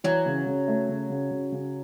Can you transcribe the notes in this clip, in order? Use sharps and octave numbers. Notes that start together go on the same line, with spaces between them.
E3 F#3
C#3
C#3
A3
C#3
C#3
C#3
C#3